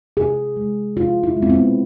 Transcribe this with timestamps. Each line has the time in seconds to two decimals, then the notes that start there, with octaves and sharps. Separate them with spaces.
0.17 C3 G#4
0.57 G#3
0.97 C3 F4
1.23 E4
1.37 G#3
1.42 C4
1.50 B3